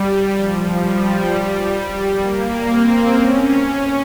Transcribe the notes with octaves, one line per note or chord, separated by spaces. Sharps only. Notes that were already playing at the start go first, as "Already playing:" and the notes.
Already playing: G3
F3
G3
A#3
C4
C#4
C#4